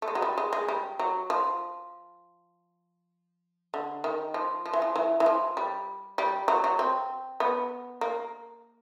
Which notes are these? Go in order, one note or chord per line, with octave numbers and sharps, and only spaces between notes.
A3
G#3
F#3
G3
G#3
G#3
G3
F#3
F3
D3
D#3
F3
F3
E3
F3
E3
E3
F3
G3
G3
F#3
F#3
C4
B3
A#3